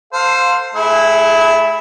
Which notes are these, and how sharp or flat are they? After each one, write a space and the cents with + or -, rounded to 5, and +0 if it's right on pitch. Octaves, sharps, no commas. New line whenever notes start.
A4 +35 C5 +0 F5 +25
A3 -45 E4 +0 G#4 -15